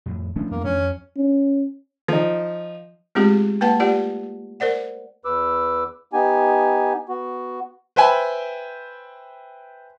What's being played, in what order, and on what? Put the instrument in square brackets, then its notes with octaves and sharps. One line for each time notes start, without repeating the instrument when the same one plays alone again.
[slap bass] F2 A2
[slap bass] A1 F3 C#4 [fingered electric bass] E3 A3 D4
[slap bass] F2 B3 [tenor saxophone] A#3
[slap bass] F2 [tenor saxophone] C#4
[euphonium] C#4
[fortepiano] F3 D#4
[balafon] G#3 A3 C4 F4 G4 G#4
A#3 B4 F#5 A5
A3 F4 G4 D5 F#5
A#4 C5 D5 F#5
[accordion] E2 B4 D6 E6
B3 D#4 G4 G#5
B3 F#4
[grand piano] B4 C5 E5 G5 G#5 B5